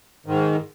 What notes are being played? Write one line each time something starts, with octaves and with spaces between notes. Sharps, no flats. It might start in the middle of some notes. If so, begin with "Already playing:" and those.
G#2 D#3